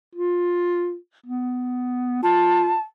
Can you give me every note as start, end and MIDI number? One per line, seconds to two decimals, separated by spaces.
0.15 0.96 65
1.26 2.23 59
2.23 2.73 65
2.23 2.81 81